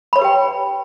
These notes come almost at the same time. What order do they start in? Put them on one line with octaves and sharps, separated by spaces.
B5 C#5 B4 G4 G5